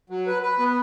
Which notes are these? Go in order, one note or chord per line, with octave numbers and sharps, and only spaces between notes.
F#3
B4
B4
B3